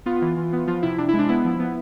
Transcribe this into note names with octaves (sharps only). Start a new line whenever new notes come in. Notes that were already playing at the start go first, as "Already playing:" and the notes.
B3 F4
E3
E3
B3
F3 F4
C3 E4
C3 D4
E4
G#3
D4
B3 E4
F3
B3